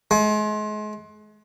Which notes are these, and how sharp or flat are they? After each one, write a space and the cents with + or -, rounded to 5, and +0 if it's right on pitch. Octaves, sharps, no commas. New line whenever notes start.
G#3 +35